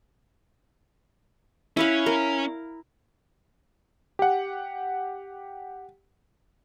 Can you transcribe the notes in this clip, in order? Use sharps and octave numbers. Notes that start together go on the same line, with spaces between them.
C#4 E4 B4 F5
A#4
G4 F#5